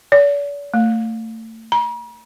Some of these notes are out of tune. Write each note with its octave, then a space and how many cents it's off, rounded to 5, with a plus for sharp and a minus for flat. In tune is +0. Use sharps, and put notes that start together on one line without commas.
D5 -45
A3 +30
A#5 +45